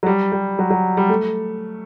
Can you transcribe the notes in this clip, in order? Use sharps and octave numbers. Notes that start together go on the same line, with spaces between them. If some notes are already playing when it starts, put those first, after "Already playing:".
F#3
G3
G3
F#3
F#3
G3
A3